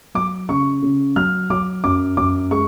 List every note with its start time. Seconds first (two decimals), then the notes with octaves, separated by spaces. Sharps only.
0.15 F#3 D6
0.49 C#3 C#6
0.82 C#3
1.16 F#3 F6
1.50 F#3 D6
1.84 F#2 D6
2.17 F#2 D6
2.51 G#3 C#6